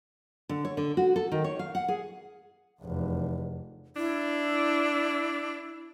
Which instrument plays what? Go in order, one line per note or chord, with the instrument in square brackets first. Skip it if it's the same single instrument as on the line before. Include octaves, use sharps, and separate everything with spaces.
[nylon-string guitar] D3
C#5
D3
F#4
A4
D#3
C#5
F5
F#5
G#4
[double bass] F1 E2
[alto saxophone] D4 [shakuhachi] E4